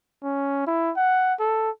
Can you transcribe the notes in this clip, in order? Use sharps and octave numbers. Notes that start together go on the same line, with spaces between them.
C#4
E4
F#5
A4